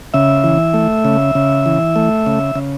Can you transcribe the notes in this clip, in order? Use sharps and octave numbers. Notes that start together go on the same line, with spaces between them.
C#3 E5
E3
A3
C#3
C#3
E3
A3
C#3
C#3